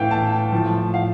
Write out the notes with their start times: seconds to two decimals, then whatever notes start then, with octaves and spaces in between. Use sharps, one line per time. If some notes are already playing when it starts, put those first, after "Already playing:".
Already playing: A2 E3 F5 G5
0.11 A5
0.52 A2 F3
0.94 F5